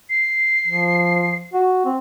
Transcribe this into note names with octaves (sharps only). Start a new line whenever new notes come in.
C7
F3
F#4
C4